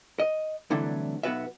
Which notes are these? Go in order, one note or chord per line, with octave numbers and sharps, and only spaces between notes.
D#5
C2 D3 E3 F#3 A3
B1 B3 F#4 B4 E5